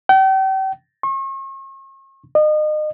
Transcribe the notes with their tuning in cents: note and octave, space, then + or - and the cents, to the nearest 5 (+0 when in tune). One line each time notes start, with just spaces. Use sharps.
G5 -40
C#6 -40
D#5 -35